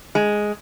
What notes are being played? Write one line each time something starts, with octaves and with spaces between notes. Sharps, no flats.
G#3